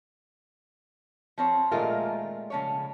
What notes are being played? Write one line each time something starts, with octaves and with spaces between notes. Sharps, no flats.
F3 C4 C#5
A#2 D#3 G#3 A3 F4 A#4
C#3 F3 C#5